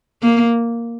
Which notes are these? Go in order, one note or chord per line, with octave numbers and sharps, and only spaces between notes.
A#3